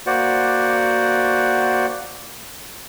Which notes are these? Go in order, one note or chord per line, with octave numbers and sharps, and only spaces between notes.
A#3 F#4 C5 D5 F#5